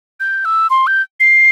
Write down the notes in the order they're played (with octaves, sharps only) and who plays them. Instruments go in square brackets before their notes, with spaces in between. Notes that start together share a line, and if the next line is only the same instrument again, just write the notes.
[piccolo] G6
E6
C6
G6
C7